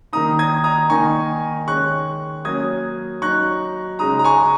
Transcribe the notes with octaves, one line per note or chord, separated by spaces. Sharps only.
D#3 A#3 D#4 A#5 D#6
D#6 G#6
A#5 D#6
D#3 A#3 D#4 G#5 C#6
D#3 G#3 C#4 C#6 F#6
F#3 A#3 C#4 D#6 G#6
F#3 D#4 C#6 F#6
C#3 G#3 D#4 A#5 D#6
A#5
G#5 C#6